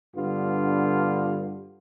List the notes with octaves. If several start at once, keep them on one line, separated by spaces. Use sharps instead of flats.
G2 D3 B3 F4